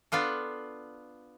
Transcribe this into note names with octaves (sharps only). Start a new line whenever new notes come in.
B3 D4 F4 A4